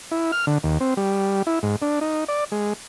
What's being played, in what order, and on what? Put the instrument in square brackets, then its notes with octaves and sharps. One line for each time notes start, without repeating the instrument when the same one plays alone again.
[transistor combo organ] E4
F6
D3
D#2
C4
G3
E4
G#2
D4
D#4
D5
G#3